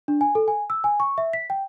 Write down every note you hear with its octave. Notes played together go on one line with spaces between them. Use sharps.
D4
G#5
A4
G#5
E6
G#5
C#6
E5
B6
G5